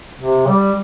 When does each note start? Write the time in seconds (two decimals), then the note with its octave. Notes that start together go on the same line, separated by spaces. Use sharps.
0.20 C3
0.47 G3